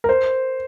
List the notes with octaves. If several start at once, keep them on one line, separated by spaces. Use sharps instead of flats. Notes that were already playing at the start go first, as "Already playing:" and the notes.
A#4
C5